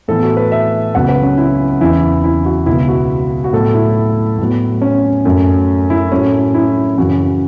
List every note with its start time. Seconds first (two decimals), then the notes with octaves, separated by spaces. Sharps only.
0.08 A2 E3 B3 A4
0.22 F#4
0.37 B4
0.52 E5
0.94 C#2 C#3 F#3 B3 F#5
1.08 B4
1.23 C#4
1.38 E4
1.81 E2 C#3 E3 E4
2.24 E4
2.45 F#4
2.66 C#2 B2 B3 E4
2.88 F#4
3.44 F#4
3.53 A2 F#3 B3 A4
3.74 E4
4.39 A2 F#3 B3
4.82 C#4
5.25 F#2 F#3 A3
5.90 E4
6.11 A2 F#3 A3 C#4
6.54 E4
6.97 F#2 C#3 E3 F#4